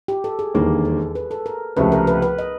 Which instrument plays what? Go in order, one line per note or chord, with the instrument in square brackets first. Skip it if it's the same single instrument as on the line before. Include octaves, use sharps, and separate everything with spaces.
[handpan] G4
A4
G#4
[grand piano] E1 D#2 D3 G3 A#3 [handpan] G#4
[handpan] A4
B4
A4
A#4
[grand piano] C#2 C3 F3 A3 [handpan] B4
[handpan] A#4
B4
B4
D#5